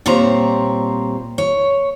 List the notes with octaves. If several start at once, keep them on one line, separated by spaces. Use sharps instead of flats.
A#2 G3 C4 C5 C#5 A#5
C#5